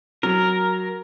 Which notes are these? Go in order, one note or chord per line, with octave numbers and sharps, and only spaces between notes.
F#3 A#4